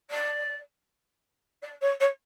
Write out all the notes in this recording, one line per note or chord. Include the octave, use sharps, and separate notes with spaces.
D5
D5
C#5
C#5